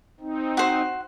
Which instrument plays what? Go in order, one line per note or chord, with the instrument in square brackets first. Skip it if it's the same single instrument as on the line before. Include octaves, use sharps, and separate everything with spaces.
[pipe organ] C4 D#4
[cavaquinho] F#4 C5